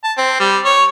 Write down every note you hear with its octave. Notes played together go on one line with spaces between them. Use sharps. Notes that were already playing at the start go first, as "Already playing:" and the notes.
A5
C4
G3
C#5